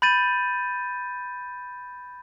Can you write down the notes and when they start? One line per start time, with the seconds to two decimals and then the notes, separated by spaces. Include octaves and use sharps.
0.02 B5 G6 A6 D#7